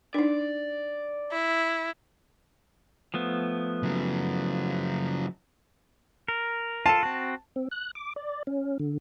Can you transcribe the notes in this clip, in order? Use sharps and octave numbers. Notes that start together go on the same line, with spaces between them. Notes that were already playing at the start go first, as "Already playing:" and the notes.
D4 D#4 D5
E4
F3 A3 B3
C#3 F#3
A#4
F4 A4 A5
C4 F#4
C4
F#6
D6
D5
C#4
D3